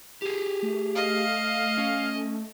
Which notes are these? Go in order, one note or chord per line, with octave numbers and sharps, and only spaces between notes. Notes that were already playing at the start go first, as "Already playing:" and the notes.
G4 G#4
A3
D#5 F5
C#4